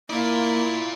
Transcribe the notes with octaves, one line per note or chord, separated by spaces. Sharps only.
A#3 E4 F4 D5